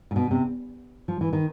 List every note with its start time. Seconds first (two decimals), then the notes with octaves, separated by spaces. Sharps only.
0.11 A#2
0.16 B2
0.31 C3
1.08 F3
1.21 E3
1.33 D#3